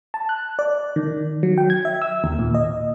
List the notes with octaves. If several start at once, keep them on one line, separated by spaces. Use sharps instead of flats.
A5
F#6
D5
D#3
F#3
G5
G#6
E5
E6
D#2
A#2
D#5